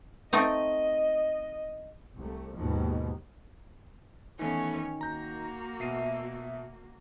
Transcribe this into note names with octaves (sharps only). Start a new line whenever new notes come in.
A3 C4 D#4 D#5
C2 A3
D#2 G#2 B2 D#3 F3
D#3 E3 A3 B3 C#4
A#3 F#4 A#5 G6
B2 E5 C7 D#7